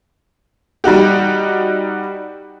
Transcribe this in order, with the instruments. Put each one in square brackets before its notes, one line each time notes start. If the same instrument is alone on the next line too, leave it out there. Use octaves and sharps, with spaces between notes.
[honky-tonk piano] G3 D#4 F#4 G4